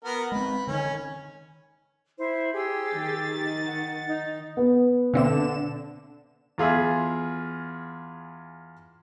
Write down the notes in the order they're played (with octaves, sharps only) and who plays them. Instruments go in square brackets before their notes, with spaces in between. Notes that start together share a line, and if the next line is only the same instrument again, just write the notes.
[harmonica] B3 F#4 A#4
[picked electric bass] G#3 C4 [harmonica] B4
[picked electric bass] D3 D#3 [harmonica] C#4
[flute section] E4 C5
G4 G#4 E6
[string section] D#3 A6
[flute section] F#5
D#4
[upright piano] B3
[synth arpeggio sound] B2 C4 E5 [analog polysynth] D3 E7
[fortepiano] E2 F4 G#4 E5